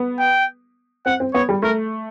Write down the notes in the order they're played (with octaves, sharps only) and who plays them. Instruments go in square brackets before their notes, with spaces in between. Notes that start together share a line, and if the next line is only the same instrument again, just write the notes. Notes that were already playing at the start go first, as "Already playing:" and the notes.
Already playing: [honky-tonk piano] B3
[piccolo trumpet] G5
[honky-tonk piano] C4 [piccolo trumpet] F#5
[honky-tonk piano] C4
[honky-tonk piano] B3 [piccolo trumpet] C#5
[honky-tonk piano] G3
[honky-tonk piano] A3 [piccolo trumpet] A#4